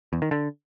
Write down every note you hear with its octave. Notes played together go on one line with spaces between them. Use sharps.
E2
D#3
D3